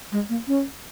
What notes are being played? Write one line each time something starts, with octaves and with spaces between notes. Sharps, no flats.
G#3
A#3
C#4